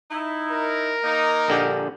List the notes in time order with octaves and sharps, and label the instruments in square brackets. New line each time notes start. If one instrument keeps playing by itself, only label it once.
[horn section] D#4 E4
[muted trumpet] A#4
[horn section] A#3 D#4
[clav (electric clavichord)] A#1 D3 G4